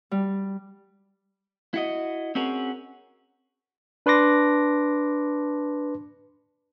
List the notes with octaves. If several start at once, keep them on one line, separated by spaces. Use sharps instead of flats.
G3
E4 F#4 D#5
C4 C#4 F#4 G#4 A#4
D4 B4 A5 C6 D6 A#6